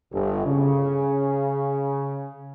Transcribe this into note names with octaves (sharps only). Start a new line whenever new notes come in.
G1
C#3